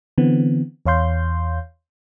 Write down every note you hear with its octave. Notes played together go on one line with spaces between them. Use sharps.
D3 E3 B3 C4
E2 C#5 F5 C6 G6